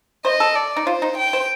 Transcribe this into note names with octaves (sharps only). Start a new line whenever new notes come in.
C5 D#5
A4
D5
D#4
F4 C5
D#4
G5
C5